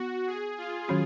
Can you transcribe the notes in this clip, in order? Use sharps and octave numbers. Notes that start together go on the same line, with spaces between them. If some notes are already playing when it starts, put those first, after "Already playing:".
Already playing: B3 F#4
G#4
F4
D#3 F#3 C#4 F#4